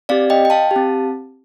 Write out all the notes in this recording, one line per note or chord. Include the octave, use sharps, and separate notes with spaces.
C4 G4 D5 F5
D#5 G5
G5
F5 A5
G4
C4